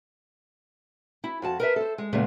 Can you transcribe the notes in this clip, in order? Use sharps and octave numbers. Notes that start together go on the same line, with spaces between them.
E4
F2 F#4 A5
A#4 B4 E5
A4 C5
G#3
E2 A#2 C#3 G#3 A3